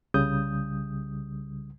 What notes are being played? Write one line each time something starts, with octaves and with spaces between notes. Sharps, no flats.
C2 C#3 G3 D#6 G6